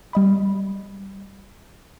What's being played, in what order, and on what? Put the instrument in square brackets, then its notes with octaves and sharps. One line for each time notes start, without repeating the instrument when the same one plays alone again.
[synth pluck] G3 D#5 B5